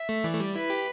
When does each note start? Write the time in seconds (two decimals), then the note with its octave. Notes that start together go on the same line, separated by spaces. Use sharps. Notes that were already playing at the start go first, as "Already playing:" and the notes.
Already playing: E5
0.09 A3
0.24 E3 D5
0.33 A3
0.40 G3
0.55 E4 B4
0.70 G4